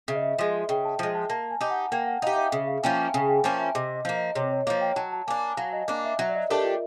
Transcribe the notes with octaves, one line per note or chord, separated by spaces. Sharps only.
C#3 E5
D#5
E5
F3 G#3
C#3 G5
A5
F3 G#3
A5
A#3 A5
G#5
D#4 G4
F#5
A#3 G5
F#5
D#4 G4 F5
E5
D#5
C#3 E5
F5
F3 A#3 C#4 G5
A5
G#5
C#3 G#5
G5
F3 A#3 C#4 A5
E5
C3 D#5
D#5
F3 A#3
D#5
C3 C#5
C#5
F3 A#3 C#5
G5
F#3 A5
A5
A#3 D4 G#5
F#3 F5
D#5
A#3 D4
E5
F#3 E5
D5
D#5
A3 D4 G4 A#4
F4